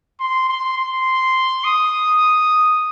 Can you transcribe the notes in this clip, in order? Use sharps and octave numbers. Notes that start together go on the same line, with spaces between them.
C6
C6
C6
D#6